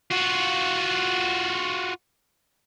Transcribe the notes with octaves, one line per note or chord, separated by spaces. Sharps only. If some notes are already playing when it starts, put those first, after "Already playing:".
F4 F#4